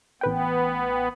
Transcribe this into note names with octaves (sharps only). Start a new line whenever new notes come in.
A1 B3 B4 G5